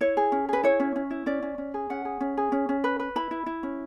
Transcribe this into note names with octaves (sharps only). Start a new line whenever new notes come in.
E4 C#5
G#4
C#4
G#4 B4
E4 C#5
C#4
C#4
E4
C#4 D5
C#4
C#4
G#4
C#4 F#5
G#4
C#4
G#4
C#4
C#4
B4
B4
E4 B5
E4
E4
C#4